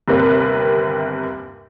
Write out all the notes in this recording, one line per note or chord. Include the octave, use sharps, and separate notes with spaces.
G1 D#2 C3 A#3 A#4 B4